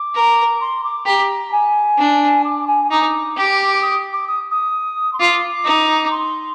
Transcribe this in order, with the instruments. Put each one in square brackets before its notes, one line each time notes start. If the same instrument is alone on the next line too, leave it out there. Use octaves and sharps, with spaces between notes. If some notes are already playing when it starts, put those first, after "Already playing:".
Already playing: [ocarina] D6
[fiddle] A#4
[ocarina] C6
D6
[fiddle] G4 [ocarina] A#5
[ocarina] G#5
[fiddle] D4
[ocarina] D6
G#5
[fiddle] D#4 [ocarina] D6
[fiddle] G4
[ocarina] D#6
D6
D#6
D#6
C6
[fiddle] F4 [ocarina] D6
[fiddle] D#4
[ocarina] D6
C6